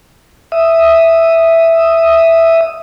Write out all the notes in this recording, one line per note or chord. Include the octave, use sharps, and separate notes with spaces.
E5 D#6